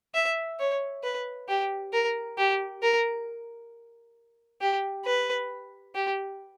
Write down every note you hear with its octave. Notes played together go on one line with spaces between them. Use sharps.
E5
C#5
B4
G4
A#4
G4
A#4
G4
B4
G4